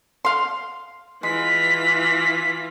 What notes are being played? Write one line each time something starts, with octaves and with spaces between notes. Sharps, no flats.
F5 C6
E3 G#3 F4 B6